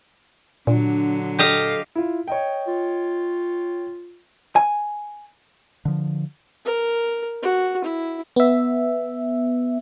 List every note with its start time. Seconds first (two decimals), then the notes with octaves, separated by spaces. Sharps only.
0.67 A#2 D3 F#3 D4
1.39 G4 A4 D#5 F5
1.95 E4 F4
2.28 C#5 D#5 G5
2.68 F4
4.56 G#5
5.85 D3 F3
6.65 A#4
7.43 F#4
7.84 E4
8.36 B3 E5